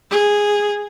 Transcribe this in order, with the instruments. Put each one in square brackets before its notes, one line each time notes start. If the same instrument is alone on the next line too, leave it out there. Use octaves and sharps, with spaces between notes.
[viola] G#4